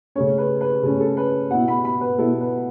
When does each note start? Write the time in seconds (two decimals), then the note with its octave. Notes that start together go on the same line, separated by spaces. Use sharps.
0.15 C#3 A3 C#4 C#5
0.38 B4
0.61 B4
0.83 C#3 A3 C#4 A4
1.00 A4
1.17 B4
1.50 B2 B3 E4 F#5
1.68 B5
1.85 B5
2.01 B4
2.18 B2 B3 E4 A4
2.41 B4